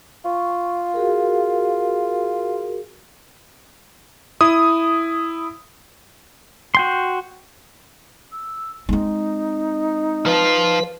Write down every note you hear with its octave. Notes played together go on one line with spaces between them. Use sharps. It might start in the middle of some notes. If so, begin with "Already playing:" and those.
F4 C#6
F#4 G#4 A#4
E4 D#6
F#4 G5 C6
E6
G#3 C4 D#4
F3 F4 B4